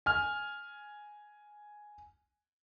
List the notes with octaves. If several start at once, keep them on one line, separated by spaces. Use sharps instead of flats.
G#5 F6